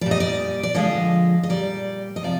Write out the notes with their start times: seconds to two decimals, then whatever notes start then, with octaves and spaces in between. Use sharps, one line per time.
0.01 A#2 G3 D5
0.11 D#5
0.20 D5
0.63 D5
0.74 D3 F3 G#3 D#5
1.43 D#5
1.49 A#2 G3 D5
2.16 D#5
2.23 C3 F3 D5